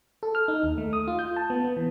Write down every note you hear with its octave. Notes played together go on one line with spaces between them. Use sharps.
A4
F6
D#4
D#2
A3
D#6
F4
G6
A5
B3
B3
E3